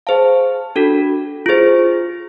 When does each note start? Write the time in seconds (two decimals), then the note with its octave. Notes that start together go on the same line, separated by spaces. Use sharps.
0.07 G#4 C5 F5 A5
0.76 D4 F#4 A4
1.46 F4 G#4 C5